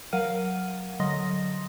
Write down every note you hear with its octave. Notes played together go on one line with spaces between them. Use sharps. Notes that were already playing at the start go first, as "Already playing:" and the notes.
F#3 A#4 F5 F#5 F6 D#7
D3 F#3 D#5 C6 D#6 A#6